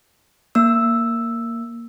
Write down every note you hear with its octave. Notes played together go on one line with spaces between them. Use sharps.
A#3 E6